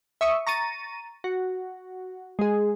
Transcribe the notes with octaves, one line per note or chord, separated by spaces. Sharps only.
E5 C#6 D#6
A#5 C#6 A6 D#7
F#4
G#3 G#4